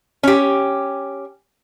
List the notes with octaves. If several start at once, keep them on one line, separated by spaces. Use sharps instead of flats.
C#4 G4